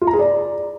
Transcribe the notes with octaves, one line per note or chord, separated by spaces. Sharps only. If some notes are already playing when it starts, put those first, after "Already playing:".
F4
A#5
G#4
D5